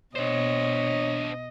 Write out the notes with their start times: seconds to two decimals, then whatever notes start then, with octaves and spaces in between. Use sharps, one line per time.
0.16 B2 D4 C5 C#5 D#5